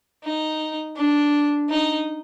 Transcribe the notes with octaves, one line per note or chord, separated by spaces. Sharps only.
D#4
D4
D#4